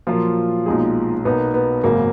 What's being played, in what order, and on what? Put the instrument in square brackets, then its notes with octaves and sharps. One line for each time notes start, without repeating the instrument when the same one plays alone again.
[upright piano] A#2 F#3 A#3 F4 A#4 [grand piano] F3
[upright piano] B1 A#2 G#3 D#4 G#4
[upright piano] B1 B2 A#3 D#4 A#4 [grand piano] B3
[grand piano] B3
[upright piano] G#1 F#2 C#3 [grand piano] A#3